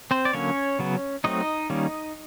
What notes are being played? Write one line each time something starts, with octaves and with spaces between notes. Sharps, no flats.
C4 C5
D5
D3 F#3 A#3 C#4 C#5
C#3 F#3 B3
F#3 A3 C4 D#4 D#5
D#3 G3 A#3 C#4